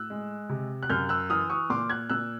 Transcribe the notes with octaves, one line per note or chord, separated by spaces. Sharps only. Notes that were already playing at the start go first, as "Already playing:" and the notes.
Already playing: A2 E6 F#6
G#3
C3
F#6
F#2 F6 G6
E6 F#6
E3 D#6 F6
C#6 D#6
A#2 C6 D6
F#6 G#6
A#2 E6 F#6